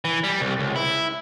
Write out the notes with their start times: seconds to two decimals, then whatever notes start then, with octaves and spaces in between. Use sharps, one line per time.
0.05 E3
0.24 G3
0.41 C2
0.59 C#2
0.76 E4